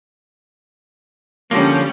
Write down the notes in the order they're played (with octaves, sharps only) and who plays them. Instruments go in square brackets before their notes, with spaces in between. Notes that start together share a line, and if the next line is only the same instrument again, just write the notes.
[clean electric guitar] D3 F3 A#3 [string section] G3 C#4